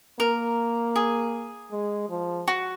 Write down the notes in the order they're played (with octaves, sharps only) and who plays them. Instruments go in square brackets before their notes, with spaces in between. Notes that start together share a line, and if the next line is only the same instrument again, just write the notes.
[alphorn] A#3 [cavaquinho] A#4
[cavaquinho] G#4
[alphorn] G#3
F3
[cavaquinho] F#4